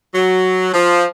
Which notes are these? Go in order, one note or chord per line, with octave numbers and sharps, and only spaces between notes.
F#3
F3